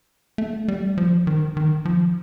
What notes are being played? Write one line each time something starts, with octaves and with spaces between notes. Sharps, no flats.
A3
G3
F3
D#3
D#3
F3